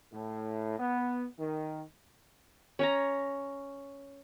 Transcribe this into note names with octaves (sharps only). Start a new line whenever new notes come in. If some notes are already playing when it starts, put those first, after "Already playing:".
A2
B3
D#3
C#4 C#5 A#5